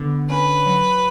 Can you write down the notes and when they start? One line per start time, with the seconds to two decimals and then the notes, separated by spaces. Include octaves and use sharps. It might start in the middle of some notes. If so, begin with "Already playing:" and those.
Already playing: D3 B3
0.30 C#4 B4
0.66 F#3